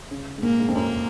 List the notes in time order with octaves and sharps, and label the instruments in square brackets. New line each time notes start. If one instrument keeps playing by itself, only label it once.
[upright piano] C#3
G#2
[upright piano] A#2 [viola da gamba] A#3
[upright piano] G#2
F2
[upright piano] F#2 [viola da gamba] A#3